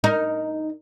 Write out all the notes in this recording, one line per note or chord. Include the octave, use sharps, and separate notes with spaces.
D#4 A#4